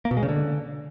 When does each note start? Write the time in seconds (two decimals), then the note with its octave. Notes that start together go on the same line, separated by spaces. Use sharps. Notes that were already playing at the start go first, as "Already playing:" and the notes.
0.05 A#3
0.11 B2
0.17 G#3
0.23 C#3
0.29 D3